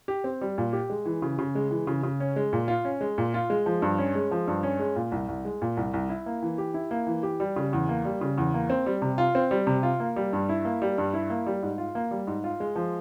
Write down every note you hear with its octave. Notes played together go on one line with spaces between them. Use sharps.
G4
C4
G3
A#2
G4
G#3
E3
C#3
C#3
G#3
E3
C#3
C#3
C#4
G#3
A#2
F4
C#4
G#3
A#2
F4
G#3
F3
G2
C#4
G#3
F3
G2
C#4
G#3
A#2
C2
C2
G#3
A#2
C2
C2
E4
A#3
E3
G4
E4
A#3
E3
G4
G3
C#3
E2
A#3
G3
C#3
E2
A#3
C4
G3
C3
F4
C4
G3
C3
F4
A#3
G3
G2
E4
A#3
G3
G2
E4
A#3
G3
G#2
F4
A#3
G3
G#2
F4
G#3
F3